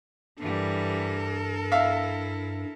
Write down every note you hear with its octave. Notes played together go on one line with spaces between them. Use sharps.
G2 E3 G3 A4 A#4
E4 E5 F5